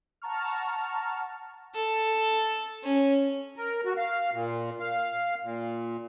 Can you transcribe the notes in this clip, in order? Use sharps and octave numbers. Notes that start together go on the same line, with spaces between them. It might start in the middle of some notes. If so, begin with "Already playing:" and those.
F#5 A5 A#5 C#6 F6
A4
C#4
A#4
F#4
F5
A#2
F5
A#2